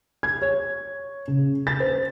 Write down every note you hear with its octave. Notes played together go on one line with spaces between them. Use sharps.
G#6
C#5
C#3
A6
C5